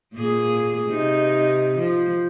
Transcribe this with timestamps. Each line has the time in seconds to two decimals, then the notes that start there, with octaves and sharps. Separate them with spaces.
0.14 A#2 A#3 G#4
0.86 C3 D#4
1.79 F3